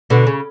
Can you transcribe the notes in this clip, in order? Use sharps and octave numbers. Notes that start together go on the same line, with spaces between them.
B2 D3
C#3